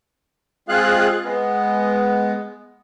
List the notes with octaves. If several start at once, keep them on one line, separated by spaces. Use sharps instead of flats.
G#3 C4 F4 G#4 F5 F#6
G#3 B3